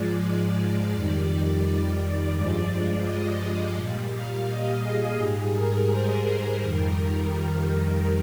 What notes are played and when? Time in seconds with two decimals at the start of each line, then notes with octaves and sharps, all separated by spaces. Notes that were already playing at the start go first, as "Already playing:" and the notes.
Already playing: G#2 F3 G#3 D5
0.92 F2 D#3 G3
2.34 G2 F3 G#3 D5
3.04 D#5
3.75 A#2 G3
4.10 F5
4.46 D#5
4.81 G#4
5.16 G#2 G3 G#4
5.52 A#4
5.87 C5
6.57 F2 D#3 G3 A#4